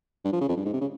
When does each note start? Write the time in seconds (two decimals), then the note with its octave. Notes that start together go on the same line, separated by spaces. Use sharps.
0.25 G2
0.33 F3
0.41 C#3
0.49 F2
0.57 G2
0.65 G#2
0.73 C3
0.81 C#3